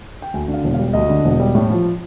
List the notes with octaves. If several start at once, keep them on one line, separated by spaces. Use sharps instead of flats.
G5
D2 G#5
D3
F5
E1
F5
G3
D2 D#5
D3
E1
G3
A2
F3